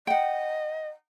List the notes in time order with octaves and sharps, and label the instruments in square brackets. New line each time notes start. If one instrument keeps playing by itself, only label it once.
[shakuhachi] D#5 [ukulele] F#5 G5